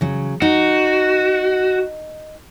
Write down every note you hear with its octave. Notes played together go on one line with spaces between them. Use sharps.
C#3 F#3
D#4 F#4